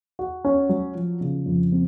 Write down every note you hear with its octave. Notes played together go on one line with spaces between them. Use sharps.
F#4
C#4
F#3
F3
C#3
F2
C4